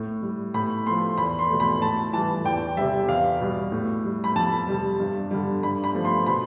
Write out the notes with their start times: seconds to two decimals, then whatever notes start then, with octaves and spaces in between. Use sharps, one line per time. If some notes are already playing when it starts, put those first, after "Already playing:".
Already playing: A2
0.23 G3
0.54 A2 B5
0.86 F3 A3 C6
1.18 E2 B5
1.39 C6
1.50 B2 A3
1.60 B5
1.82 A2 A5
2.13 E3 G3 A5
2.45 E2 G5
2.76 C3 G3 E5
3.09 E2 F5
3.40 B2 G3
3.72 A2
4.05 G3
4.24 B5
4.35 F2 A5
4.68 C3 G3
5.00 G2
5.31 D3 G3
5.63 G2 B5
5.84 B5
5.95 F3 A3
6.05 C6
6.26 B2 B5